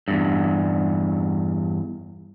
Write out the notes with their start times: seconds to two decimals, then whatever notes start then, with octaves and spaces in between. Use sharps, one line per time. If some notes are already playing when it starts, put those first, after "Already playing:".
0.08 E2 G2